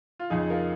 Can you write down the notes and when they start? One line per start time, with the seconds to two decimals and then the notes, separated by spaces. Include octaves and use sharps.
0.20 F4
0.30 F2 C#3 F3 D#4 G#4
0.50 F4 A#4